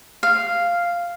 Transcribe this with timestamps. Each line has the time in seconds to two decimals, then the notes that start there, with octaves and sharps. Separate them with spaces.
0.23 F5